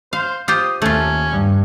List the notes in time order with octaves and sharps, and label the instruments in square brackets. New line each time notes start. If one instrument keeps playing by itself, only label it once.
[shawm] C5 [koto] F5
[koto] F4 G4 C5 [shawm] D#6
[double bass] D#2 [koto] A3 F4 [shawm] C#4
[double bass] G2